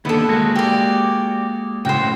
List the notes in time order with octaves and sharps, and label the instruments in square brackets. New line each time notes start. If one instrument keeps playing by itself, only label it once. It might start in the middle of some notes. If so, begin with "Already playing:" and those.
[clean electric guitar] D#2 D3 B3 [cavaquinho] E4 A4
[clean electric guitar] G#3 A#3 F#4
[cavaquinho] G4 D5
[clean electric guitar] A2 C#3 F#4 [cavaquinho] C5 G5